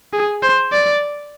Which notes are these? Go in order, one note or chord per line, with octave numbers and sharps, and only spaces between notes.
G#4
C5
D5